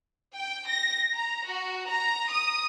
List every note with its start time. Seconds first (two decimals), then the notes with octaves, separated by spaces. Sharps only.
0.36 G5
0.68 A#6
1.16 A#5
1.48 F#4
1.88 A#5
2.32 D#6